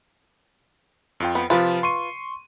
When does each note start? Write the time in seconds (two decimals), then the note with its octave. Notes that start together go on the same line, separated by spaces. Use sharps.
1.20 F2 F4 G5
1.35 B3
1.50 C3 F3 F4 B4
1.83 C6 C#6 D#7